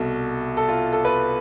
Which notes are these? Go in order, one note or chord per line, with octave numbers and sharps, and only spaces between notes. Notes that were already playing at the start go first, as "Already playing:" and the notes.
Already playing: C2 B2 A4
A4
F4
A4
B4